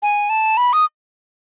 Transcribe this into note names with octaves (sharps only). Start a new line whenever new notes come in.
G#5
A5
B5
D#6